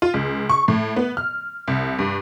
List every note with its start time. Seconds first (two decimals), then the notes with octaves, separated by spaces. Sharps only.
0.02 F4
0.14 C#2
0.49 C#6
0.68 A2
0.96 B3
1.17 F6
1.68 C2
1.99 G2